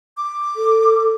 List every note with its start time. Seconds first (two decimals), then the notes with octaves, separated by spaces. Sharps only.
0.17 D6
0.56 A4